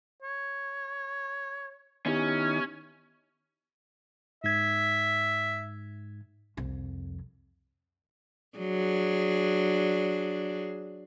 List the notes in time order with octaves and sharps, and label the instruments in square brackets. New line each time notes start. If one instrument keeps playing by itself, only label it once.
[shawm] C#5
[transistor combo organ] D#3 D#4 E4 [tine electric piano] B3 G4 [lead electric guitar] C#4
[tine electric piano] G#2 G#6 [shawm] E5
[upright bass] C2 F2
[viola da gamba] F#3 D4 G#4